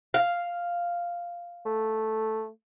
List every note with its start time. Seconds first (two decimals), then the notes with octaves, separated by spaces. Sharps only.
0.14 F5
1.66 A3